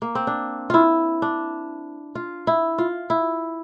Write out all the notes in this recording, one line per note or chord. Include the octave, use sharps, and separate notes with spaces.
A#3
C4
D4
E4 F4
D4
F4
E4
F4
E4